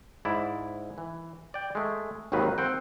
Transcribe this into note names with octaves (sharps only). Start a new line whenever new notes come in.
G#2 E4 D5
E3
D5 G5
G#3 A3
G#1 D#2 D#3 F#3 B4
C4 F#5 G5